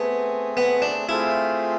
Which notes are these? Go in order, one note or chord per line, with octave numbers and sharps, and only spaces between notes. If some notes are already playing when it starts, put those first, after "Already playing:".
Already playing: A3 B3 C4 G#4
B3
D4
A3 C4 E4 F4 G#4